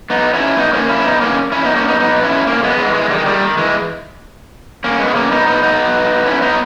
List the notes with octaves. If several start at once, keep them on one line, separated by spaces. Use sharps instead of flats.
B3 D#4
C#4 E4
B3 D#4
A#3 C#4
C#4 E4
B3 D#4
A#3 C#4
C#4 E4
B3 D#4
A#3 C#4
B3 D#4
B3 D#4
C#4 E4
A#3 C#4
G#3 B3
E3 G#3
E3 G#3
D#3 G3
G#3
D#3 G3
D#3
E3 G#3
A#3 C#4
G#3 B3
A#3 C#4
B3 D#4
B3 D#4
B3 D#4
C#4 E4
B3 D#4